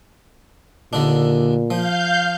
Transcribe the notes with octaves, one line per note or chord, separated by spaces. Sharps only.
D#2 A#2 D3 D4
F3 F5 G6